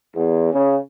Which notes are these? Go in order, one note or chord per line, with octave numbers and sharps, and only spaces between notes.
E2
C#3